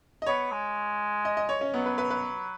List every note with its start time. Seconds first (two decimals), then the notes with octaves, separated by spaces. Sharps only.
0.22 D#5
0.26 B3 C#5
0.52 G#3
1.25 D#5
1.37 D#5
1.49 C#5
1.61 C#4
1.73 F#3 B3
1.86 B4
1.98 B4
2.10 B4